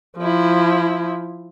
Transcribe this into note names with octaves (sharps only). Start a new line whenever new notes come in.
F3 E4